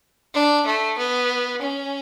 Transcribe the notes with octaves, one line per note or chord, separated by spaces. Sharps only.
D4
A3
B3
C#4